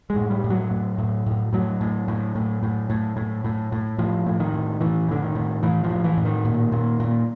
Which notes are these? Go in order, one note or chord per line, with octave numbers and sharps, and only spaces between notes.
G#3
A2
G3
A2
F#3
A2
A2
A2
A2 F#3
A2
A2
A2
A2
A2
A2
A2
A2
A2 F3
A2
D#3
A2
A2 E3
A2 D3
D#3
A2
A2 E3
F3
A2
E3
A2
D#3
A#2
A#2
A#2